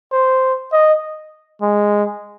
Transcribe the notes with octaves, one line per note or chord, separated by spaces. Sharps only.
C5
D#5
G#3